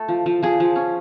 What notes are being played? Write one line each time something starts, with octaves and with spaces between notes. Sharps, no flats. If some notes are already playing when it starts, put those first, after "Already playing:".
Already playing: A3 A4
F3
F3
F3 G#4
F3
C#4